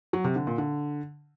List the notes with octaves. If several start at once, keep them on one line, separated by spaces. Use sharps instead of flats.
F#3
C3
D3
A#2
D3